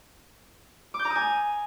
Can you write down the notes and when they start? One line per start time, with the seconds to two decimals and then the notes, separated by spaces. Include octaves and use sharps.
0.94 D6
0.99 G6
1.05 A#5
1.10 D#6
1.16 G#5